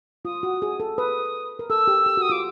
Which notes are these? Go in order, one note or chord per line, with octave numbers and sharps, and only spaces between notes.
F4 D#6
F#4
G#4
A4
B4 D#6
A#4
A4 E6
G4
G4
F#4
D#6
F4 D6